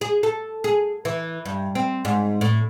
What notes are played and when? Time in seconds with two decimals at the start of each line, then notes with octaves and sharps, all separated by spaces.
0.01 G#4
0.23 A4
0.64 G#4
1.05 E3
1.45 G2
1.75 C4
2.05 G#2
2.41 A2